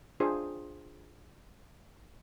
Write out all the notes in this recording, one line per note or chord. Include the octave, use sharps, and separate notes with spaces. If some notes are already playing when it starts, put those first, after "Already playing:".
D4 F4 G#4 C5